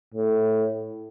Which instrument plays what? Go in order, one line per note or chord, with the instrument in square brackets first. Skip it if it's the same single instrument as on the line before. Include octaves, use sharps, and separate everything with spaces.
[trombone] A2